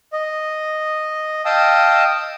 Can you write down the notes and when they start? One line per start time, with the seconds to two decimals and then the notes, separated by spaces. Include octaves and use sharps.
0.13 D#5
1.45 D#5 F5 G5 A5 D#6 E6